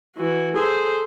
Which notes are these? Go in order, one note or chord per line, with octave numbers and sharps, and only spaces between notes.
E3 F#4
G#4 A4 C5